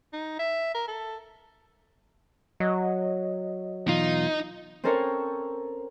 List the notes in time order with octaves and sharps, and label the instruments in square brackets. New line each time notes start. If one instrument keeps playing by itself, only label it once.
[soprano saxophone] D#4
E5
A#4
A4
[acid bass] F#3 [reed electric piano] D#5
[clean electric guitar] B1 E2 F4 [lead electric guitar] D#4
[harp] C4 C#4 A4 A#4 C5 C#5